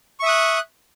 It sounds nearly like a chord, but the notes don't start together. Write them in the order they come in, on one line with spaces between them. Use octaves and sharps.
C#6 E5 D#6 F#6